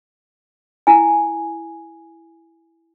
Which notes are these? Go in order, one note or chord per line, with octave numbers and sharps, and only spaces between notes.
E4 G#5